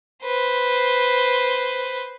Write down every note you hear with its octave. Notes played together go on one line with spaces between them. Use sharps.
B4 C5